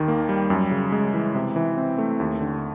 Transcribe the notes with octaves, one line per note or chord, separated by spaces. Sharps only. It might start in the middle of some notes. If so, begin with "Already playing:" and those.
Already playing: D#2 D#3
A#3
G3
F#2
C#3
G#3
E3
C3
E3
C4
A3
D#2
D3